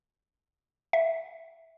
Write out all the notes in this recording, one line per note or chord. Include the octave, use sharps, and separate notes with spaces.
E5